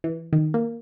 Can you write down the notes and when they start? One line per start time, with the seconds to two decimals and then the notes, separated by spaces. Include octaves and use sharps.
0.04 E3
0.33 D#3
0.54 A#3